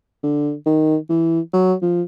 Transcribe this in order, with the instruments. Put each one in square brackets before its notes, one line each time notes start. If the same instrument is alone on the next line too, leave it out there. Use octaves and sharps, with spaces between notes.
[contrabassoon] D3
D#3
E3
F#3
F3